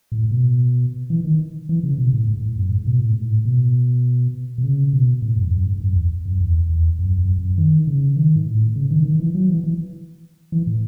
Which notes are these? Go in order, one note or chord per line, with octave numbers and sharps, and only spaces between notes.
A2
B2
E3
D#3
E3
C#3
B2
A2
G#2
A2
F#2
G#2
B2
A2
G#2
A2
B2
B2
C#3
B2
A2
F#2
E2
F#2
G#2
F#2
E2
F#2
E2
E2
F#2
F#2
F#2
D#3
C#3
D#3
G#2
A2
C#3
D#3
D#3
E3
F#3
E3
E3
E3
A2